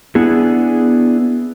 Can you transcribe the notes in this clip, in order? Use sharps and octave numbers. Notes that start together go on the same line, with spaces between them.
B3 D4 E4 G#4